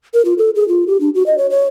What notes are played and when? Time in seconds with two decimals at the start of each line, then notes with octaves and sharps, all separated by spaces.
0.14 A#4
0.25 F4
0.38 A4
0.55 G#4
0.68 F4
0.87 G4
1.01 D4
1.15 F#4
1.26 D#5
1.38 C#5
1.50 C#5